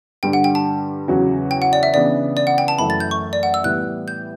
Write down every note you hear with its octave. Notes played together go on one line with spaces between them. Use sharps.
G2 D3 G3 G5
F#5
G5
A5
E2 C#3 F#3 C#4 F#4
G5
F#5
D5
E5
C#3 E3 B3 D4 D5
D5
F#5
G5
A5
F#2 E3 A3 E4 B5
A6
G6
C#6
D5
F#5
E6
A2 E3 G3 B3 F#6
G6